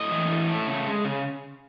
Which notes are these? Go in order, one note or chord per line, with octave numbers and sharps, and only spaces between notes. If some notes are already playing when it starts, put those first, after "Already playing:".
Already playing: A2 D#5
E3
A2
A3
C#3
G#3
C#3